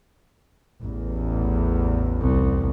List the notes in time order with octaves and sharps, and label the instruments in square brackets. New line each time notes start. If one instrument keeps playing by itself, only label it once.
[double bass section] A1 E2
[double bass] C2